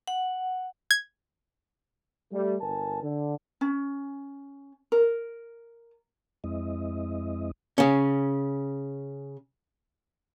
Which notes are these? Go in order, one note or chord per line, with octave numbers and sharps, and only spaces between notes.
F#5
G#6
G3 A3
G1 A#4 G#5 A5
D3
C#4
A#4
F2 G#3 C4 E4 D#5
C#3 C#4